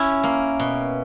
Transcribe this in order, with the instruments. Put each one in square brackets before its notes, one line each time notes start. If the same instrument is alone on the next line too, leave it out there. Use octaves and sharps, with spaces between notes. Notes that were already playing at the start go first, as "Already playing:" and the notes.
Already playing: [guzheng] C#4 E4
A#3
B2